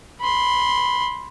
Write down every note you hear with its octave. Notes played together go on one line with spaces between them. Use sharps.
B5 C6